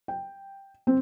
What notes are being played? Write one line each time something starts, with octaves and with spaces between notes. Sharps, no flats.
G5
C4